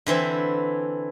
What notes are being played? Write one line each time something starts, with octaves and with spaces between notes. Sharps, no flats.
D3 E3 C4 E4